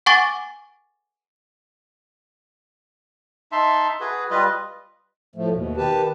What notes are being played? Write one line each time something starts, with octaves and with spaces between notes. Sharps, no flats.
F#5 G#5 C#6 D6 A6
D#4 E5 A5 C6
F#4 G#4 B4
G3 F4 B4 D#5
A2 F3 A3
D#2 B2
D#3 G4 B4 A5